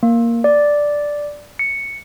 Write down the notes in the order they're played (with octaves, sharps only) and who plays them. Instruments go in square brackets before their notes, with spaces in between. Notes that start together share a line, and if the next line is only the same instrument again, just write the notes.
[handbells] A#3
D5
C#7